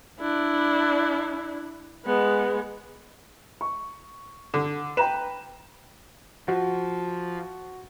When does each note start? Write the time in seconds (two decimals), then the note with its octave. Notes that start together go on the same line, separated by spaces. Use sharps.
0.20 D4 E4
2.06 G#3 B3
3.61 C#6
4.54 D3
4.97 B4 G5 A#5 E7
6.48 F3 F#4